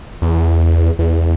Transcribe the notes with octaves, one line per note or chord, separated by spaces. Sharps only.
E2
E2